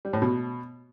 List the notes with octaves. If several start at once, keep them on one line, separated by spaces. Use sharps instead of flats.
G3
A2
B2